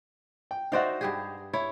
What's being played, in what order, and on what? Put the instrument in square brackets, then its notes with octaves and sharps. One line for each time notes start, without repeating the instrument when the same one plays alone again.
[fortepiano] G5
[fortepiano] D#4 C5 E5 [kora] F#4 D5 F5
[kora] G2 G4 G#4
[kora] E4 [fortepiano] C#5